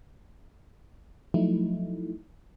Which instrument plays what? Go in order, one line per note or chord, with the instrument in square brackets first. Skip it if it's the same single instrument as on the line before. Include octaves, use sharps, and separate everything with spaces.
[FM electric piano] F3 F#3 A3 D#4 E4